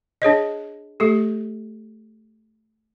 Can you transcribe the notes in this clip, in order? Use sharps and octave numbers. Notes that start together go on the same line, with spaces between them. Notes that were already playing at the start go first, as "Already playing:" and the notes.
D4 G#4 C#5 D#5
A3 G4 A4